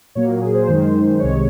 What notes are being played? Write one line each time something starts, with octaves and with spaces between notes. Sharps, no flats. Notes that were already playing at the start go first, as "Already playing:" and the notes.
A#2 F#3 A#3 C#5
G#4
C5
F#2 D#3 G#3
C2 C3 D#3 G#3 C#5